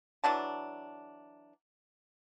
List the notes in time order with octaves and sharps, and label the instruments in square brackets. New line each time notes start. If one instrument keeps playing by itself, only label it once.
[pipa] E3 F#3 D4 A5